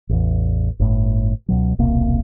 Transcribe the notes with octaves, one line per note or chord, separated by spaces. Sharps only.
A1 E2
G1 A2
C#2 B2 F#3
D#1 B1 C3 A#3